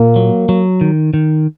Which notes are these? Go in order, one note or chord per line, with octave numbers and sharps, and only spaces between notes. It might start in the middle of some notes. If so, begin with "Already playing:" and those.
Already playing: A#2 A#3
F#3
F#3
D#3
D#3